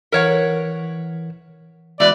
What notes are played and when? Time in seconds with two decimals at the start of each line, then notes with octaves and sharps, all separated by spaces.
0.12 E3 A#4 C#5 F#5 B6
2.00 E3 G#3 B3 F#4 D5